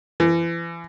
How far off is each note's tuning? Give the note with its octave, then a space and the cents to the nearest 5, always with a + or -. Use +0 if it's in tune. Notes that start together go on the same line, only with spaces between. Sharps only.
E3 +35